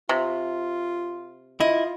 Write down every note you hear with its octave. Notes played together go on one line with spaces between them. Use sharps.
C3 F4
E4 F4 D#5